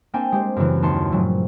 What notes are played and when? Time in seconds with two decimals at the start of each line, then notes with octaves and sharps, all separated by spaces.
0.14 A#3 C4 D4 G5 G#5
0.32 G#3 G4 C5
0.56 F#2 C#3 E3
0.82 D#2 A5 C6 C#7
1.12 G2 A#2 C#3 F3 F#3 A3